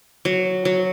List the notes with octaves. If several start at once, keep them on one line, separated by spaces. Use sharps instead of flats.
F#3
F#3